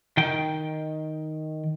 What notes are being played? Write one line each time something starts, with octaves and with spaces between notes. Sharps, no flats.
D#3 G5